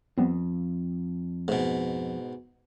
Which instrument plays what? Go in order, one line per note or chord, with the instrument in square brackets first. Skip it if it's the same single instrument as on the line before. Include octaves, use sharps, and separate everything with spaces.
[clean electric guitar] F2 [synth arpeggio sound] G3 B3 C4
[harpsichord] G#2 B2 [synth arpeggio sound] A3